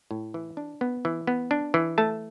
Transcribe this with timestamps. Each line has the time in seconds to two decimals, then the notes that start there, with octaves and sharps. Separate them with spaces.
0.11 A2
0.34 E3
0.57 D4
0.81 B3
1.05 E3
1.27 B3
1.51 D4
1.74 E3
1.98 A3 A5